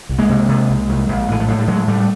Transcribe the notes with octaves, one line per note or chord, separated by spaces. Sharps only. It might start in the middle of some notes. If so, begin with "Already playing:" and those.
C2
G#3 A#3
C3
C3
C2
C2
A#1
A2 E3
F3
A2 F#3
G3
A2 F#3 G#3
A2 G3 A3